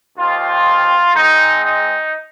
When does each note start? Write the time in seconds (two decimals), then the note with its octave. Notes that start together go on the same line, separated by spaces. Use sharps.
0.18 D#2 D#3 C4 F4
1.15 G#2 G#3 C4 D#4
1.63 D#4